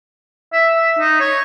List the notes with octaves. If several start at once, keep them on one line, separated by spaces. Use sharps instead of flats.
E5
E5
D#4
C#5